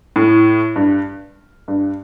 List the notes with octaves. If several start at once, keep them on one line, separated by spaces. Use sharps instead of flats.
A2
G2
G2